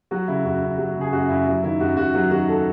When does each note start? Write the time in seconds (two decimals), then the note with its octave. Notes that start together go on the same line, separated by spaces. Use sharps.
0.11 F#3 F#4
0.28 C#3 E4
0.44 F#2 F#4
0.62 F#2
0.78 F#3
0.96 C#3 G#4
1.12 F#2 F#4
1.29 F#2 E4
1.47 F#3 E4
1.63 D#3 E4
1.80 F#2 F#4
1.97 F#2 F#4
2.14 F#3 F#4
2.31 D#3 F#4
2.48 A4